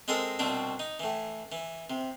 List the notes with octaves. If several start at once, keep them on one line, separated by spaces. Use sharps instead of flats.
G#3 C4 A4 A#4 D#5
C2 B2 C4 D4
D#4
A2 E3
E3
C3